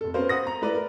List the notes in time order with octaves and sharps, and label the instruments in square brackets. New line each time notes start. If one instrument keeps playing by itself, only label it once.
[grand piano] F1 A4
B3 C#4 F#4 A#4 C5 F5
C5 F#5 D#6 A#6
A#5
A3 E4 B4 D5
A#4